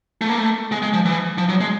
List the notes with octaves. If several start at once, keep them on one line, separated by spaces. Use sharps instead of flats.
A3
A#3
A3
G#3
G#3
F3
E3
F3
F#3
G#3